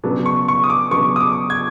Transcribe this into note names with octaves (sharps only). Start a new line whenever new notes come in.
C#3 F#3 B3 D4
C#6
C#6
D#6
D6
C#3 F#3 B3 D4 C#6
D#6
D6
G#6